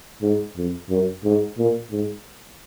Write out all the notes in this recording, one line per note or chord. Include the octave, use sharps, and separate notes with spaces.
G#2
F2
F#2
G#2
A#2
G#2